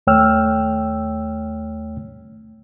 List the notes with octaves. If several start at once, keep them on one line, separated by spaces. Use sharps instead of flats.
D#2 A3 C#5 G5 E6 F6